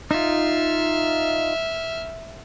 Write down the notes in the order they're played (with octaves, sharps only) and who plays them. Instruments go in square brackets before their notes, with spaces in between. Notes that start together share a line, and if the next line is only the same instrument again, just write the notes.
[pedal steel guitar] D#4 F4 [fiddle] E5 F6